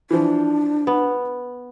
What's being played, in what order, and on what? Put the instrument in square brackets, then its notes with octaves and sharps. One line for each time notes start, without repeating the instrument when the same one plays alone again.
[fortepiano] E3 F3 [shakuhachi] D4
[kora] B3